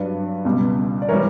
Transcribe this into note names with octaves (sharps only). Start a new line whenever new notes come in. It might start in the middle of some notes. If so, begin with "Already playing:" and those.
Already playing: G2 F#3 B4 D5
C#2 B2 G3
D5
E3 G3 A#4 C#5